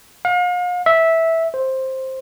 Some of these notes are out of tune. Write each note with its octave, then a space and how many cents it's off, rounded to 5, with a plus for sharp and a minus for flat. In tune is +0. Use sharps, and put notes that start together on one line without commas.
F5 +40
E5 -10
C5 +10